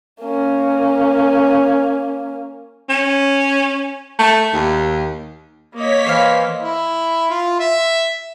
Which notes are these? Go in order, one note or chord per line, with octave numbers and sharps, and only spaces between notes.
A#3 C#4
C#4
A3
D#2
A#3 C#5 D#5 B6
E3 C5 F5
E4
F4
E5